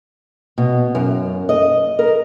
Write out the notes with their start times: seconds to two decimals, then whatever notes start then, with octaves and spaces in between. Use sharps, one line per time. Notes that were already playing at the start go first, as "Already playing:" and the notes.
0.58 B2
0.95 F#2
1.49 D#5
1.99 A#4